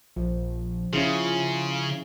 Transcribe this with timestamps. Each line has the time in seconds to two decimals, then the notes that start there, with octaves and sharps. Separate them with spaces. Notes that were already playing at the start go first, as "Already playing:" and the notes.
0.16 A#1 F3
0.93 C#3 C#4 E4 F4 G#4